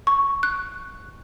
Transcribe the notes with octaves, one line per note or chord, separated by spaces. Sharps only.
C#6
F#6